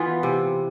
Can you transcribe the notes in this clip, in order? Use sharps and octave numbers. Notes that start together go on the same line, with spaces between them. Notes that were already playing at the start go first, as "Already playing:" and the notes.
Already playing: E3 B3 F4
C3